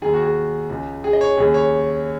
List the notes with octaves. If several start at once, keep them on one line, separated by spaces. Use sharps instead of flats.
D#2 D#3 G#4
F#4
G#4
C#2 C#3
G#4
D#5
C#5
D#2 C#3 G#4
C#5